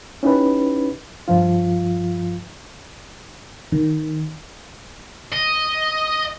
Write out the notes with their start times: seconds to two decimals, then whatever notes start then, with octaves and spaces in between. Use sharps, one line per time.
0.23 C#4 D#4 E4 G4 B4
1.28 G2 F3 F4
3.72 D#3
5.33 D#5